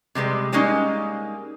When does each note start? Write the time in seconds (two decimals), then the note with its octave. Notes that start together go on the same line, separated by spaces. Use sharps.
0.15 C3 G3 G#3 B4
0.52 G3 G#3 A#3 C#4 D#4